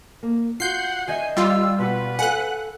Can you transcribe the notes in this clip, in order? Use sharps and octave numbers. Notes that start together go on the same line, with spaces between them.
A#3
F4 F#4 F#5 G6 C7
D#3 D#5 E5 G#5
G3 F4 E6
B2 B4 F#5
A4 F5 F#5 G#5 F#6